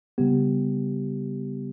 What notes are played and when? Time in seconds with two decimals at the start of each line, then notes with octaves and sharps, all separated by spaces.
0.18 C#3 G3 B3 G4